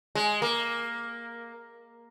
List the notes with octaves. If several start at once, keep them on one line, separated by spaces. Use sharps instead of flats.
G#3
A#3